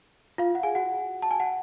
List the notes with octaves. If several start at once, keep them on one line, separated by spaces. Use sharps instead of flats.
F4 F5
F#5
G#4 G#5
F#4 F#5
A5
G#5
F#5